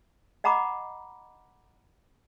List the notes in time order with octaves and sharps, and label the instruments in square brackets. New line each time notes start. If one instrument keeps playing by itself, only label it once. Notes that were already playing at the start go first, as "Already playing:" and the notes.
[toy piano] D#5 F#5 A#5 B5 D6